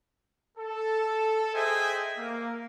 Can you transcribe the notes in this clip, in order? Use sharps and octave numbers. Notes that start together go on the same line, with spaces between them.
A4
G#4 C5 D#5 E5 G5 G#5
A#3